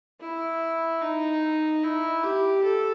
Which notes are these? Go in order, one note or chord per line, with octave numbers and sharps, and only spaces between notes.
E4
D#4
E4
G4
A4